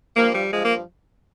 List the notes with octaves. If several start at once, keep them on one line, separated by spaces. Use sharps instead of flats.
G2 F3 A#3
G3
G2 F3 G#3
A#3